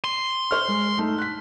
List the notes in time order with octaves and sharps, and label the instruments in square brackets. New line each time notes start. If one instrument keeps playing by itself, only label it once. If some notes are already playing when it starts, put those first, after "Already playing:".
[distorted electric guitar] C6
[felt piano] C5 C#6 F6
G#3
A3 D#4
F#6 B6